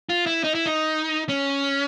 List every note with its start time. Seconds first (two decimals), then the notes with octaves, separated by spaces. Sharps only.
0.09 F4
0.26 E4
0.44 D#4
0.55 E4
0.66 D#4
1.29 C#4